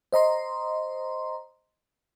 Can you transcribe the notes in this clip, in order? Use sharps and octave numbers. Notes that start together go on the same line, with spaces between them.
C5 D#5 A#5 C6